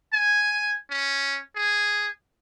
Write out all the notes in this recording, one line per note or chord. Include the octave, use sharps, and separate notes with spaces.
G#5
C#4
G#4